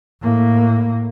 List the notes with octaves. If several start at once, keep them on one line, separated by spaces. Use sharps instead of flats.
A2 A#3